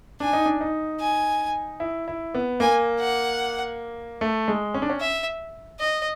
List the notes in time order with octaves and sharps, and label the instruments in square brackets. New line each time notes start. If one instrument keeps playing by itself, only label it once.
[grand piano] D4 [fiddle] G#5
[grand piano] D#4
D4
D#4
[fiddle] G#5
[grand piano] E4
E4
B3
[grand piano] A#3 [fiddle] G#5
[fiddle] F#5
[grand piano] A3
G#3
C#4
D4
C#4
[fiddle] E5
D#5